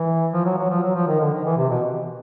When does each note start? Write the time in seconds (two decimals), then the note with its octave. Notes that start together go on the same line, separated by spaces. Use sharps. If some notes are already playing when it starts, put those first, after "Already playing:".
Already playing: E3
0.33 F3
0.45 F#3
0.58 F#3
0.70 F3
0.83 F#3
0.96 F3
1.07 D#3
1.20 D3
1.33 D#3
1.45 E3
1.57 C3
1.70 B2